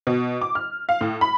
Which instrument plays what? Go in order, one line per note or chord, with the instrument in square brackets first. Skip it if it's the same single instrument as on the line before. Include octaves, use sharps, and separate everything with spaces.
[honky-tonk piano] B2
D6
F6
F5
A2
B5